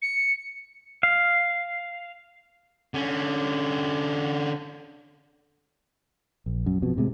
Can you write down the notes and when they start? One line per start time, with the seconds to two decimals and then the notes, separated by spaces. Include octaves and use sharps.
0.02 C#7
1.03 F5
2.94 D3 C#4
6.46 A#1
6.66 F#2
6.82 F2 B2
6.97 A2 C3 G#3